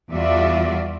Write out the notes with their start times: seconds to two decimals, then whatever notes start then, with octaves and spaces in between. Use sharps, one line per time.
0.11 E2 G3 F4 F#4 D5 E5